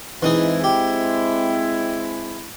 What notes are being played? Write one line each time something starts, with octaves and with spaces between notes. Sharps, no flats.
E3 G#3 C4 D#4 E4 G#4
G4